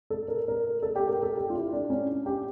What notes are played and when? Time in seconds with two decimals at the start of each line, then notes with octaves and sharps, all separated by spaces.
0.10 A4
0.28 A#4
0.48 A#4
0.83 A4
0.96 G4
1.09 A#4
1.23 A4
1.37 G4
1.50 F4
1.55 E4
1.73 D4
1.90 C#4
2.26 G4